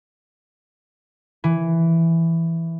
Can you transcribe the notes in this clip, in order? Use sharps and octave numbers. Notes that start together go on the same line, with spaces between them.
E3